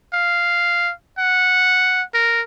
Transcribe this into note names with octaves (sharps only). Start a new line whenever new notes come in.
F5
F#5
A#4